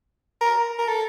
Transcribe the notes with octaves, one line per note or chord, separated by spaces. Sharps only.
A#4
A#4
A4